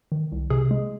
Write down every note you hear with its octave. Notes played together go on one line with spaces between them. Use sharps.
D#3
C2
C3 G#4
G#3